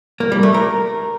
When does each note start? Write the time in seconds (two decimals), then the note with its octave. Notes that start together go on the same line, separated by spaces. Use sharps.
0.20 A#3
0.32 G3
0.43 A3
0.54 A#4